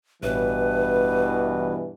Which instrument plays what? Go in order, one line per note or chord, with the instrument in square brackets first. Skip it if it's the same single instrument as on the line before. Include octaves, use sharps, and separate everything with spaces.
[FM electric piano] A1 [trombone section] G2 B2 E3 [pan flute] B4